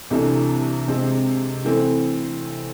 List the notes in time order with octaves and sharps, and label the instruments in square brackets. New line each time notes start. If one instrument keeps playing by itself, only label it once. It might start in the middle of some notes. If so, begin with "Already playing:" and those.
[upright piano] C2 C3 E3 A3 D4
C3 G#3 C4
E3 A3 C4